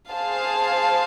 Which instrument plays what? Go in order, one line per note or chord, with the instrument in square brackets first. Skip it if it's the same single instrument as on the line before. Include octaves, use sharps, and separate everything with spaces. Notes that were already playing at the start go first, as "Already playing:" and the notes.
[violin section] G#4 C5 F5 A5